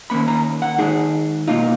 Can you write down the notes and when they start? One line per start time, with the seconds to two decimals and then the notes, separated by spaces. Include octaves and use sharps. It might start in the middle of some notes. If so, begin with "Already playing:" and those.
0.10 D#3 A#3 C#4 B5
0.28 A#5
0.62 F#5
0.78 D#3 G#3 D#4 G#4
1.47 B2 A#3 D#4 F4